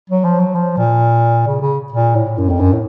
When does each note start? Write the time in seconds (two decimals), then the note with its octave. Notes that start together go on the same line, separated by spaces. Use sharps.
0.10 F#3
0.24 F3
0.39 F#3
0.55 F3
0.77 A#2
1.47 C#3
1.61 C#3
1.92 A#2
2.15 A2
2.38 F#2
2.49 F2
2.60 F#2
2.73 A2